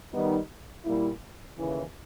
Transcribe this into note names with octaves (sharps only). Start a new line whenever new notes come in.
D#3 G3 B3 D#4
A#2 G3 A#3 E4
D#2 C#3 E3